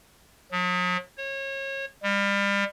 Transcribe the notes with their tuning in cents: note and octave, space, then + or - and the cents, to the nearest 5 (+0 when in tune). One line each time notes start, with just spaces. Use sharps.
F#3 -45
C#5 -30
G3 +35